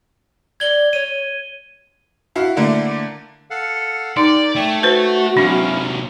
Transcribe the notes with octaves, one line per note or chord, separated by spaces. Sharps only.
D5 G#6 G7
C#5 D#7
E4 F#4 F5
D3 A3 A#3 D4 E4
A4 F5 F#5
D#4 G4 A#4 D5
A3 C#5 G5
F#4 B4 C5
C3 F#3 C#4 D4 E4 F5